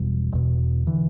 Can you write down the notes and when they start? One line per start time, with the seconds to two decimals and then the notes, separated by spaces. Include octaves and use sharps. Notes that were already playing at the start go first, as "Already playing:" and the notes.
Already playing: E1 E2 B2 G3
0.32 E1 E2 B2
0.87 D3 E3